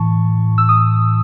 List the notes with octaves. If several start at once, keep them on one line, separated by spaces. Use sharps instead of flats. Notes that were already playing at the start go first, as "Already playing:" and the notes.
Already playing: A2 E3 A5 C#6
E6
D#6